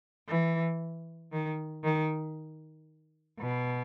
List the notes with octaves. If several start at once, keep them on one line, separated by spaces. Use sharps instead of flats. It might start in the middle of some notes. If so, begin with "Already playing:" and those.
E3
D#3
D#3
B2